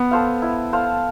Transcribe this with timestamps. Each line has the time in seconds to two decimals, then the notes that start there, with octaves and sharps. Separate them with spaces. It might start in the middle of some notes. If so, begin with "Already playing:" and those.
Already playing: B3
0.11 A4 C5 F5
0.42 E4
0.72 A4 C5 F5